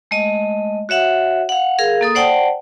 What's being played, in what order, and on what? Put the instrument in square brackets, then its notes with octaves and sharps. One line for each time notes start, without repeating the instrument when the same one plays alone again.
[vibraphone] G#3 A3 D#5
F#4 C#5 E5 F#5
F5 F#5
G#4 A#4 F5
A#3 A4 D#6
C5 D5 F#5 G5 A5